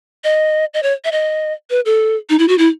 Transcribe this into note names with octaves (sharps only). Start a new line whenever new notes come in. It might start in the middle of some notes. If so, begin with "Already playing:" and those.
D#5
D#5
C#5
E5
D#5
B4
A4
D#4
E4
F#4
E4